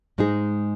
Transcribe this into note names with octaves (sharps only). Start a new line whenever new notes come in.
G#2 G#3 D#4 G#4